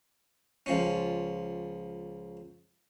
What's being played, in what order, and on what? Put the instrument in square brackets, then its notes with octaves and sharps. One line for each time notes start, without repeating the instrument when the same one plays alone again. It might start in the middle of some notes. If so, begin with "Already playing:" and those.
[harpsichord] C#2 F3 C#4